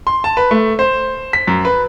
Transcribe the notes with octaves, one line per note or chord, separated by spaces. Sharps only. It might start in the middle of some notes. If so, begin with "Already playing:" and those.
C6
A5
B4
A3
C5
B6
F#2
B4